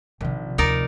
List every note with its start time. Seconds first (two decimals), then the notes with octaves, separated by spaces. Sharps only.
0.21 A#1 C3 D#3 F3 D#4
0.58 D2 D#4 A#4 D5